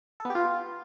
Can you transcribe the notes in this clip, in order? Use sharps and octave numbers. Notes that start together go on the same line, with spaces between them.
A4
B3
G4
F4